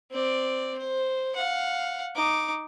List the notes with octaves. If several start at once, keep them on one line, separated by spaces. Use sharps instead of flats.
C4 D5
C5
F5 F#5
D#4 D6